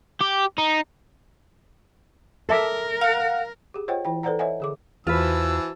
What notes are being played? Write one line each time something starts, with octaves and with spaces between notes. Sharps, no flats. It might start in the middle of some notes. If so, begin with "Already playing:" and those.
G4
D#4
A4 A#4 E5 D6
F5 F#5
G4 G#4
F4 C5 C#5 D#5 F#5 G5
E3 E4 G5
A4 B4 C5 D5 F#5 A#5
C#5 D#5 E5 F#5 G#5
D3 G#4 D6
E2 E3 F4 F#4 B4 C5 A5 E6